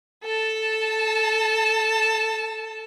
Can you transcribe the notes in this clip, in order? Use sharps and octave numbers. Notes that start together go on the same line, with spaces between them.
A4 A5